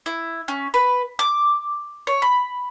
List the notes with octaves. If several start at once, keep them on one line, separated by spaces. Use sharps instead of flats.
E4
C#4
B4
D6
C#5
B5